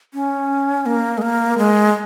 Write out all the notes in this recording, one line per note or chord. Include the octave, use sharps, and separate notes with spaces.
C#4
A#3
G#3
A#3
G#3